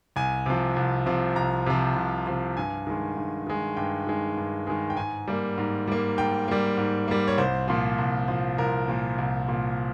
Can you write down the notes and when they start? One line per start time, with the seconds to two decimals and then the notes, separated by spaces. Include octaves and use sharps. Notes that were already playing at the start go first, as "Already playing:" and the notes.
0.16 C2 G#5
0.46 C3 F3
0.76 C2
1.06 C3 F3
1.36 C2 A#5
1.66 C3 F3
1.96 C2
2.27 C3 F3
2.57 G2 G#5
2.87 D#3 G#3
3.17 G2
3.47 D#3 G#3
3.77 G2 G5
4.07 D#3 G#3
4.37 G2
4.67 D#3 G#3
4.90 G5
4.97 G#2 G#5
5.28 G3 A#3
5.58 G#2
5.88 G3 A#3
6.18 G#2 G5
6.48 G3 A#3
6.77 G#2
7.08 G3 A#3
7.28 C#5
7.38 C2 C5
7.68 A#2 F3
7.98 C2
8.28 A#2 F3
8.58 C2 A#4
8.88 A#2 F3
9.18 C2
9.49 A#2 F3